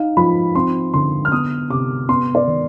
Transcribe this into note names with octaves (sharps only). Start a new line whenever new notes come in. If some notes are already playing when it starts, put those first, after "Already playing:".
Already playing: D#4 F5
F3 B5
C4 C6
D3 C6
F6
B3 D#6
C3 D6
B3 C6
D5
D#3